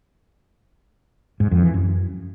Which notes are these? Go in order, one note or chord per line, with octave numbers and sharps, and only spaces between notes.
G#2
F2
E3
F#2